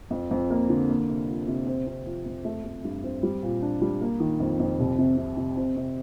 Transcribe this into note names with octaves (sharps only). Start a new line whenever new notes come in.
F2
F2
A#3
D3
A#3
C3
F3
C3
C4
C4
F3
F2
A3
A3
G2
C4
G3
A#2
D4
G3
A#3
D#3
F2
F2
C2
C3
C3
C3
C4
C3